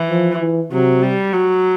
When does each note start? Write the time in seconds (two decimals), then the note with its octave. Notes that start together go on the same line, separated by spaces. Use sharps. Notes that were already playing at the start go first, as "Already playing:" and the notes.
Already playing: E3
0.10 F3
0.40 E3
0.72 C3 F#3
1.02 G3
1.33 F#3